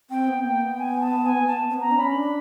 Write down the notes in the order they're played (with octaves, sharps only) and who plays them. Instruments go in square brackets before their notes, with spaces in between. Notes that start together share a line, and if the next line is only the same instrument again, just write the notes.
[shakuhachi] C4 [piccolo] G5
[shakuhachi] B3
[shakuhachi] A#3 [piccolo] G5
[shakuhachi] B3
[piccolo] G#5
A5
G#5
[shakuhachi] B3 [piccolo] A5
[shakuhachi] C4
B3
[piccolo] A#5
[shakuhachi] D4
[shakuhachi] C#4 [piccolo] B5
[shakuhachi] D4